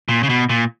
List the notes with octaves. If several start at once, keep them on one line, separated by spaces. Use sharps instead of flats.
A#2
C#3
B2
A#2